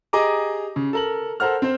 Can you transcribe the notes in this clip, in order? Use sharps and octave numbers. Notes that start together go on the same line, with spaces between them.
G4 G#4 D#5 A#5 D6
C#3
A4 A#4 F#7
A4 A#4 C5 F#5 F6
C4 C5